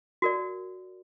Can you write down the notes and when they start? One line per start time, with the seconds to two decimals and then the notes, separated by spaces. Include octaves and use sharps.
0.22 F#4 A#4 D5